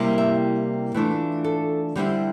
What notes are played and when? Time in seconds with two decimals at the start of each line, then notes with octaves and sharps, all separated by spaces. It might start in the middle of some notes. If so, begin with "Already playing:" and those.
Already playing: C3 G3 A#3 E4
0.18 E5
0.94 E3 A3 D4 F4
1.44 A4
1.95 D3 G3 C4 E4 G4